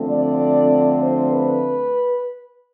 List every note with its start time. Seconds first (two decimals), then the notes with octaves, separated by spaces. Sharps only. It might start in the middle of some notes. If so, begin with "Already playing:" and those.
Already playing: D3 F3 A3 C4
0.09 D5
1.02 C5
1.33 B4